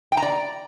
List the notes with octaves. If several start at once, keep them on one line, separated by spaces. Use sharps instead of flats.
G5
A#5
D5